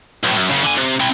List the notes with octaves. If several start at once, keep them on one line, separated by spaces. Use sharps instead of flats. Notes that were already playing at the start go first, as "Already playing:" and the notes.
B1 A2
F#2
F#2 C#3
D3 G#5
C3
C4 E4